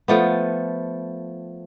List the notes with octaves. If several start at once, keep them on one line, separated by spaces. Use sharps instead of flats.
F3 A3 B3